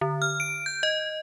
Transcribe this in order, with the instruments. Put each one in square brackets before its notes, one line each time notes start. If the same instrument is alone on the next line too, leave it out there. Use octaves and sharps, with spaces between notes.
[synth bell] D3
F6
D7
G6
D#5